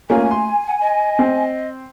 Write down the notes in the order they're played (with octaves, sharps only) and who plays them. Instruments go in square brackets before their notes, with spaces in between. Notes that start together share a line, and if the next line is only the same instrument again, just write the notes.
[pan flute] A3 [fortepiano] A#3 C#4 F4 [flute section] G#5
[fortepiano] C6
[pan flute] F#5
D#5
[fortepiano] C4